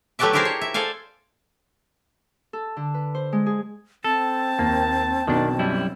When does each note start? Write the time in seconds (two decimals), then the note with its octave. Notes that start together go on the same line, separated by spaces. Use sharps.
0.19 F#3 A3 G4 B4 D5 E5
0.33 E4 G4 G#4 A#4 C5 D5
0.45 C#5
0.61 E5
0.74 A4 C5 D5 F5 G#5
2.53 A4
2.77 D3
2.94 B4
3.15 C5
3.32 G#3
3.46 G#4
4.04 C4 A4 A5
4.59 D#2 A#3
5.27 B1 B2 D#3 D4
5.59 F#2 G3 E4